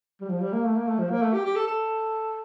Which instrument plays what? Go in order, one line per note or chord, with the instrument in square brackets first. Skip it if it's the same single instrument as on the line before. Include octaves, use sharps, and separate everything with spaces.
[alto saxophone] G3
F3
G3
A#3
A3
A#3
A3
F3
A#3
A3
G4
G4
A4
A4